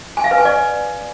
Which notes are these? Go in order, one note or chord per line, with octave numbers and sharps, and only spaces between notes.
G#5
F5
B4
G#5
D5